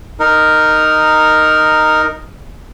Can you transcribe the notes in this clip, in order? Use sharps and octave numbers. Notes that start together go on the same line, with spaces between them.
D#4 A#4